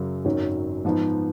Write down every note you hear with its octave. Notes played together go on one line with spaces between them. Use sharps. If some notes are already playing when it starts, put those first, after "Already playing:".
Already playing: F#2 C#3 F#3
G#1 F#2 D#3 F#3 C#4
G#2 F3 B3 D#4